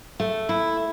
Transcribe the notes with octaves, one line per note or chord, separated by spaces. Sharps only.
A3
E4